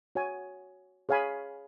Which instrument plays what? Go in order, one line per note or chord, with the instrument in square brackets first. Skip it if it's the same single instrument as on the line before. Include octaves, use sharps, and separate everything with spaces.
[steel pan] F#4 C#5 G#5
G#4 C#5 F5 G#5 B5